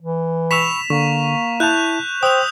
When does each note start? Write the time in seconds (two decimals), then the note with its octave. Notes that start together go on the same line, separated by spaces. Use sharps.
0.02 E3
0.51 B5 C#6 E6 B6 E7 F7
0.90 D3 A#3 C#6
1.60 E4 A5 F#6 G6 F7
2.23 C5 G5 D#6 E6 F7